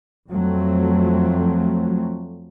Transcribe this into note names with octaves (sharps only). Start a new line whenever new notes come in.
F2 F#3 A3 C4